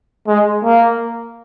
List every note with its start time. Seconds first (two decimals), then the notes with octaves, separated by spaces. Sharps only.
0.28 G#3
0.65 A#3